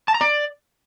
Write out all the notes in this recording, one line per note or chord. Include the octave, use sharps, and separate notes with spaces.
A5
A#5
D5